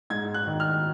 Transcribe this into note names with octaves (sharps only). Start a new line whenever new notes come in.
G#2 G#6
F#6
D#3
F6